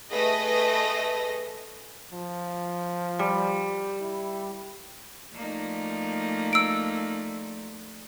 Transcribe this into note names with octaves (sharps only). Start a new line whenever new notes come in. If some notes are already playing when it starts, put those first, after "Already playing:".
A3 G#4 B4 D#5 D#6 A#6
F3
G3
E4
F3 A3 A#3 D#4 D5
E6 D7